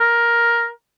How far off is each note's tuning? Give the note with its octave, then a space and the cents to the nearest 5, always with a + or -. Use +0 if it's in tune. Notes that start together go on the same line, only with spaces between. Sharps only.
A#4 +10